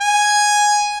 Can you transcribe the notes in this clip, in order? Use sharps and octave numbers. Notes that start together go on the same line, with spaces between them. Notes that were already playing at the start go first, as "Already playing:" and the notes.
G#5